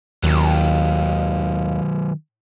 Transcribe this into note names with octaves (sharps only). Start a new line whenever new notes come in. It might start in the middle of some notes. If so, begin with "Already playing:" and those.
D#2 D#3 F#3